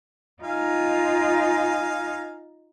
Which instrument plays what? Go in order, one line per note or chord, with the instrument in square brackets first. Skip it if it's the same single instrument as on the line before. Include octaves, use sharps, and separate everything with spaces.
[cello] D#4 F4 [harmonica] F5 G#5